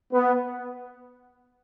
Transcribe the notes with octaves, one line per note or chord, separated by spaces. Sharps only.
B3